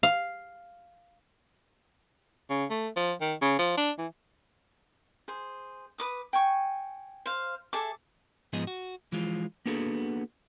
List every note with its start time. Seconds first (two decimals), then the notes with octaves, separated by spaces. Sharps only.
0.03 F5
2.50 C#3
2.71 A3
2.96 F3
3.21 D#3
3.42 C#3
3.59 F3
3.78 D4
3.99 E3
5.28 G#4 C5
5.98 B4 D6 D#6
6.33 G5 G#5 C#6
7.26 C5 F5
7.73 G#4 A4 E5 D6
8.53 G#2 F3 B3 G#4 D#5
8.67 F#4
9.12 E3 F3 G#3 F4
9.66 A#3 B3 D4 F#4 G#4 A4